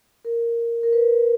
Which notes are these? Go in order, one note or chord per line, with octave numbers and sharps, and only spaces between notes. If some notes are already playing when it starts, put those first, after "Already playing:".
A#4
A#4
B4